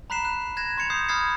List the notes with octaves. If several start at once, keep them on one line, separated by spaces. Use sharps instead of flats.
A#5 B5 F#6 B6 C7 E7
F#6
F#6 G#6 A#6 E7
C6 G#6 C#7 F7
D#6 G6 C7
B5 D#6 F6 G#6 A6 C7